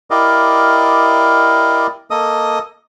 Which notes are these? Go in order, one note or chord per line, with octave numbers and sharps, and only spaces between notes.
E4 G4 A#4 D5 D#5 F5
A#3 A4 D#5 D#6